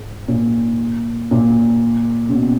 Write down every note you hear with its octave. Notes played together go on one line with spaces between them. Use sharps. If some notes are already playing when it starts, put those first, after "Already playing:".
Already playing: G#2
A#2
A#2
C#3
B2